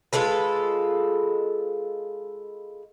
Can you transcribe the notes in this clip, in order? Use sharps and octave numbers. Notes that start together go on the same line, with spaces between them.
G#3 F4 A4 B4